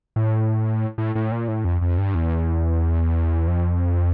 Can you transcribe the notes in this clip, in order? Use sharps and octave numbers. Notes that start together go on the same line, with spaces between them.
A2
A2
A2
A#2
A2
F2
F2
G2
E2
F2